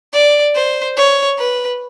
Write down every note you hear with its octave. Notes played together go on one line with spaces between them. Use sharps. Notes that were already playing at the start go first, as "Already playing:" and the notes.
D5
C5
C#5
B4